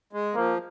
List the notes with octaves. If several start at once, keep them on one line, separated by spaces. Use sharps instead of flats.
G#3
F3 A#3